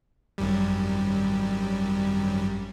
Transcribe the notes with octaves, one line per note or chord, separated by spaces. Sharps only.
G#1 F#2 G3